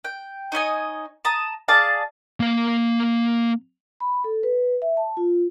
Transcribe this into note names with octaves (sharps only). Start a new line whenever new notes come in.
G5
D#4 C#5 D#5 G#5
A5 A#5 D#6
G#4 D5 F5 A5
A#3 F5
B5
A4
B4
E5
A5
F4